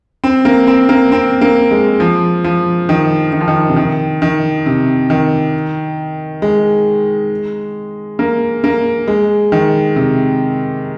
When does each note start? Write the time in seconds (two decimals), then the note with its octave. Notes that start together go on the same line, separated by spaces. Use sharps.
0.24 C4
0.45 A#3
0.67 C4
0.89 A#3
1.12 C4
1.41 A#3
1.71 G#3
2.00 F3
2.44 F3
2.89 D#3
3.33 D#3
3.41 F3
3.48 D#3
3.69 C3
3.76 D#3
4.22 D#3
4.66 C3
5.10 D#3
6.42 G#3
8.19 A#3
8.64 A#3
9.07 G#3
9.52 D#3
9.96 C3